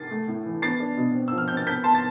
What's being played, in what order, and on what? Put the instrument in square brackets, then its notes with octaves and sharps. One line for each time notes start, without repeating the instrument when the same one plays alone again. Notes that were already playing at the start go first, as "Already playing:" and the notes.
Already playing: [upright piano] A6 C7
A3
A2
E3
B3 A6 C7
D4
B2
C4
F3 E6
F6
C4 G6
A6
B3 G6 B6
B3 A5 C6
A6